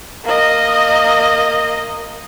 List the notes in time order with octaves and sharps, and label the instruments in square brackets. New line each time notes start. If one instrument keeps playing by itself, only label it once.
[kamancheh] A#3 D#5